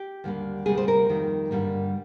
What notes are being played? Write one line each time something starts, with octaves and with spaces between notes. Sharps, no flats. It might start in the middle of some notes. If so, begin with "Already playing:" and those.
Already playing: G4
D#2 D3 G3 A#3
D2 C3 G3 A#3 G#4
C5
A#4
F2 D#3 G3 A#3
G2 D3 G3 A#3